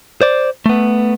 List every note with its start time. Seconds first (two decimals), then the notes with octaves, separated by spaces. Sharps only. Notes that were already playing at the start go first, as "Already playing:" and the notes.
0.22 C5 D5
0.66 A3 B3